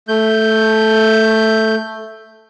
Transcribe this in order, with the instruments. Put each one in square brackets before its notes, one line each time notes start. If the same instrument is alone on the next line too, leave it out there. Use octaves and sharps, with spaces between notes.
[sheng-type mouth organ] A3 G6